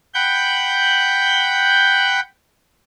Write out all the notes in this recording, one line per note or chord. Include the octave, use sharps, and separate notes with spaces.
F#5 G5 B5 G6